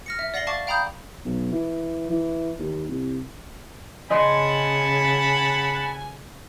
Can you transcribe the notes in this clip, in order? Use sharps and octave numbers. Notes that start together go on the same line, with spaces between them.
F6 A#6 C#7
E5
D5 F#5 A#6 C7 F#7 G7
F5 A5 C#6 D6 A6
F5 G5 A#5 B5 D#6 G6
B1
E3
E3
D#2
C2
C#3 D#5 F#5 G#5 A5 B5 C6 G#6